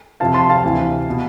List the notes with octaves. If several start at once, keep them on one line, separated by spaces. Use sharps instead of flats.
F2 C3 F3 F5 A5
A5 C6
F5 A5
D2 C3 E3
B2